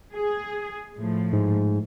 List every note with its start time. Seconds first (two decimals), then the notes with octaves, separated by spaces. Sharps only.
0.13 G#4
0.97 A2 F3
1.33 G#2